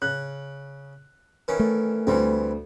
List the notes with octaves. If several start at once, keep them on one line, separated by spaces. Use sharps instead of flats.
C#3 F#6
D#3 E3 C#4
A3
D2 E3 G3 C4